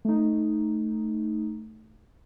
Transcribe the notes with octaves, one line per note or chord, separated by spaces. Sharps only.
A3 D#4